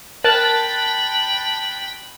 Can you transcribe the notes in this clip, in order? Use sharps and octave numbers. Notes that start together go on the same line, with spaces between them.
A#4 G5 A5 B5 F#6 A6